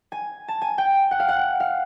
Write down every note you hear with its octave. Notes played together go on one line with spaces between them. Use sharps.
G#5
A5
G#5
G5
F#5
F5
F#5
F5